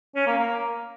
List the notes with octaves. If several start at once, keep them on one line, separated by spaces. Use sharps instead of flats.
C#4
A#3
A#3